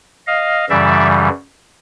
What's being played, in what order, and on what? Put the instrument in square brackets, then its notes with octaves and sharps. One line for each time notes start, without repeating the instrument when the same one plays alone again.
[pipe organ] D#5 F5
F#2 C#3 E3 G3 D5 E5